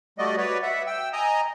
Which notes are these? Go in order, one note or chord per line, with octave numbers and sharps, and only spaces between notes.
G3 A3 F#4 D5 D#5
F#4 B4 C#5 D5
E5 F#5
G5 E6
D#5 G#5 A#5 D#6